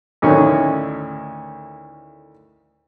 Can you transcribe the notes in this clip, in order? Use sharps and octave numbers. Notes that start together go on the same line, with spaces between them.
D2 A2 D#3 C#4